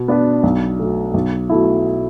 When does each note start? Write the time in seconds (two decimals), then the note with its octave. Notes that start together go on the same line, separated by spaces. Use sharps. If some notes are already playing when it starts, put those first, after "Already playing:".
Already playing: B2
0.08 B3 D4 B4
0.43 B1
0.79 B2 A3
1.14 B1
1.49 B2 A3 E4